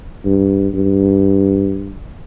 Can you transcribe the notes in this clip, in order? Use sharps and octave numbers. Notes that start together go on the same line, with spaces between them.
G2
G2